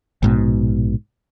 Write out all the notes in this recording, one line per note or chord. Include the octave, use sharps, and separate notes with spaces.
A#1 G#2 B2